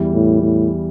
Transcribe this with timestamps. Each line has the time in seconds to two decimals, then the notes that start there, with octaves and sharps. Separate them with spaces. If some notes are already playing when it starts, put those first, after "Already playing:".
Already playing: E2 E3 G3
0.13 A2
0.42 A2